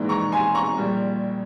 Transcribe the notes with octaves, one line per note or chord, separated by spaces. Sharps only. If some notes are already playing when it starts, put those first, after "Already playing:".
Already playing: A#1 G#2 E3
A#5 C#6
G#5 C6
A#5 C#6
A#1 A#2 G3